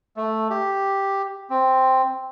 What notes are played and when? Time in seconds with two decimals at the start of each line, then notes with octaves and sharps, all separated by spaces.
0.17 A3
0.50 G4
1.50 C4